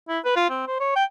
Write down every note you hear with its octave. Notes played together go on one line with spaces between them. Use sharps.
E4
B4
F4
C4
C5
C#5
G5